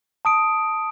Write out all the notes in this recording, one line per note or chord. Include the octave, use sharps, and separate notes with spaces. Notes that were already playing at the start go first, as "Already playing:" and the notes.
A5 D#6 D7